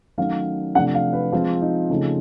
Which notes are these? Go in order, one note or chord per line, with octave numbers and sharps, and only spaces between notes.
D#3 F#3 A3 C#4 F5
C3 F3 A3 D4 F#5
F5
B4
F3 G#3 C4 F4
D#4
C#3 F3 A3 C4 D#4